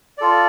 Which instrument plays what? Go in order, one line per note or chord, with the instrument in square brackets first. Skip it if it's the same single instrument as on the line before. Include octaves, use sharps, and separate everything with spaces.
[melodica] F4 A4 D5